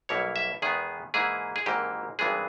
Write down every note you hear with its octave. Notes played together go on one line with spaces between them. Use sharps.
B1 B2 G3 A#3 E4 C#5
E5
E2 D#3 G#3 B3 G#4
G#2 E3 A#3 E4 G#4
G#4
G#1 G#2 E3 A#3 G4
G#1 G2 E3 G#3 B3 G#4